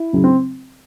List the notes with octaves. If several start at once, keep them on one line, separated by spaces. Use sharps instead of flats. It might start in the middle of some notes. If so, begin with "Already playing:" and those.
Already playing: E4
C#3 F#3
C4